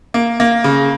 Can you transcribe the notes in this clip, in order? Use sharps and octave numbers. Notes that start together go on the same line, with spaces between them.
A#3
A#3
C#3